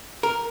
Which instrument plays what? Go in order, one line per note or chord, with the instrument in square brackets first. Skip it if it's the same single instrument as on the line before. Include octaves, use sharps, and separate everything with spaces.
[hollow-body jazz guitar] A#4